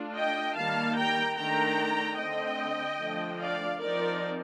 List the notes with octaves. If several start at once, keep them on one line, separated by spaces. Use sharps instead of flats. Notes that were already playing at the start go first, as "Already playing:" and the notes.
Already playing: A3 D4 F4
D#5 G5
D#3 G3 A#3 F5 A5
G5 A#5
D#3 A3 D4 G5 A#5
D3 A3 C4 D#5 G5
D3 F3 A3 D4
D5 F5
F3 C4 D#4 A#4 D5